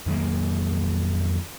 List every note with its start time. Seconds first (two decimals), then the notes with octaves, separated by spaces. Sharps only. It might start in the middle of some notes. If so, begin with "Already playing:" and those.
0.06 F2 D#3 F#3 A#3